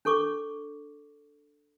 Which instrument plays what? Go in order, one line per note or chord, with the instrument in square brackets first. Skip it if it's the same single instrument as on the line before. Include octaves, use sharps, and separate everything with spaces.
[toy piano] D4 A4 C#6 D6